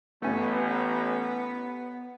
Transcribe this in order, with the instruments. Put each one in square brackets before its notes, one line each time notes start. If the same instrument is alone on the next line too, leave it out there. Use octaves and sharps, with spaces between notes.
[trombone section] A1 [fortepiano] A3 C#4 [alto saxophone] B3